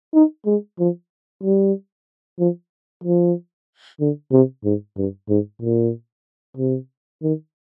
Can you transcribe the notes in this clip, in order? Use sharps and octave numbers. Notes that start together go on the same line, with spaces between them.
D#4
G#3
F3
G3
F3
F3
D3
C3
G#2
G2
G#2
A#2
C3
D#3